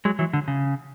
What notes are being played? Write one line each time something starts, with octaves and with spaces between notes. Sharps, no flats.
F#3 G#3
E3 F#3
D3
C#3